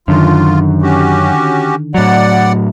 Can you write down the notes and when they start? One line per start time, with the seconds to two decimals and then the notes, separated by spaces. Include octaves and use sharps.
0.08 F#2 D3 D#3 F4
0.82 C#4 F#4 G4
1.94 A2 F#3 D5 F#5